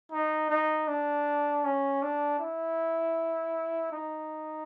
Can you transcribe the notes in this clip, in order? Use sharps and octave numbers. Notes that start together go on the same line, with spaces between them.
D#4
D#4
D4
C#4
D4
E4
D#4